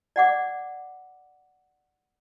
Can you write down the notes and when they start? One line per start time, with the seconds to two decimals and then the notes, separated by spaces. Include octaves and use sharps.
0.16 D5 F#5 D6